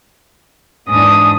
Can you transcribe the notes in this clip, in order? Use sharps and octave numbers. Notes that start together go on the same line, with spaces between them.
E2 G#2 D4 D#6